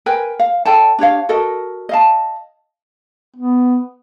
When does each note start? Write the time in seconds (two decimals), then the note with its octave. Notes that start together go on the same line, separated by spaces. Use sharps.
0.06 A#4 B4 G5 G#5
0.39 F5
0.65 A4 D5 G5 A5
0.99 D4 G4 C#5 F5
1.29 F#4 A4 A#4 D#5
1.89 D#5 F5 A5
3.36 B3